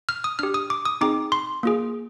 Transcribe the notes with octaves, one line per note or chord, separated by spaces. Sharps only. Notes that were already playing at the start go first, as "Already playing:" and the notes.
F6
D#6
D4 G4 F6
D#6
D6
D#6
C4 D#4 G#4 D6
C6
A#3 F4 G#4